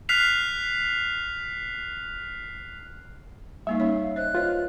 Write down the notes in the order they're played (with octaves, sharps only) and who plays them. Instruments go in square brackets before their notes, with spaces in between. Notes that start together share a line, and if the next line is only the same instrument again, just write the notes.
[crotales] F6 F#6 B6 C7 F7
[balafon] G3 A#3 D#4 [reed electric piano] E5 [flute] F5
[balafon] C#4 D#4 C#5
[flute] F5
[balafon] C5 C#5 D#5 [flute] F#6
[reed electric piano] F4 [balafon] B4 C#5 D#5